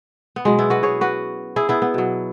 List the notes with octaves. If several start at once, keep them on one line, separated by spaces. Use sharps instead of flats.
B3
B2 F#3 G#3 C#4
B3 E4
F#4 B4
G#4 C#5
F#4 B4
E4 G#4
B3 E4
B3
B2 F#3